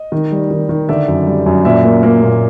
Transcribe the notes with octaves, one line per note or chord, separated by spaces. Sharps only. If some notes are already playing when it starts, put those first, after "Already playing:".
Already playing: D#5
D#3
G3
D#3
D#3
D3 D5 E5
F#2
G3
F#2
A#2 D5 E5
A#3
A#3
A#2